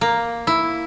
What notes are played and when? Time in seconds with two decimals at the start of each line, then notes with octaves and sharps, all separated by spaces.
0.01 A#3
0.47 E4